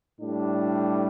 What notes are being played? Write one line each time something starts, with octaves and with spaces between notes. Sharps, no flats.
A2 G3 D4